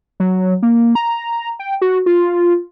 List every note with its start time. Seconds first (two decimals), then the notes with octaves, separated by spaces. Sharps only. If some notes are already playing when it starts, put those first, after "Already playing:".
0.20 F#3
0.62 A#3
0.95 A#5
1.59 G5
1.82 F#4
2.06 F4